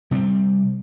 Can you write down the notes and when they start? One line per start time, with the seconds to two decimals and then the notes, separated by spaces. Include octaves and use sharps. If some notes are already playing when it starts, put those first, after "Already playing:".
0.11 C3 G3 G#3 C4